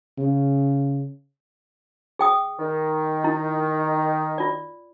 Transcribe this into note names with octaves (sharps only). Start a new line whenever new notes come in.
C#3
G#4 G5 D#6
D#3
E4
F4 D5